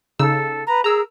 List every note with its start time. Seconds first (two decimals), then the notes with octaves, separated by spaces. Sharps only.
0.19 C#3 D#4 A4 E6
0.67 B4 A#5
0.84 G#4 A#4 A#5 E6